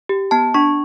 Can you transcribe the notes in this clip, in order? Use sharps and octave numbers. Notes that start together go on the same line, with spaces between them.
G4
B3 A5
D4 C#6